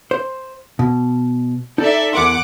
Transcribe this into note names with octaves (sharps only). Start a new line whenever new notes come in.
C5
B2
D#4 A4 D5 E5
E2 A#4 F#5 C6 D6